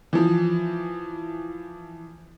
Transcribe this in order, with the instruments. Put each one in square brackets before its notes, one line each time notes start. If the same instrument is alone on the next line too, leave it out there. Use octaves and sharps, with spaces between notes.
[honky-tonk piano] E3 F3